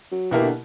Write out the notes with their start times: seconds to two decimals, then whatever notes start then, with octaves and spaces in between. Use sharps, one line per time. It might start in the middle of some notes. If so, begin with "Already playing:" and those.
0.12 F#3
0.31 B2 E3 A#3 E4 G4 A#4
0.42 D3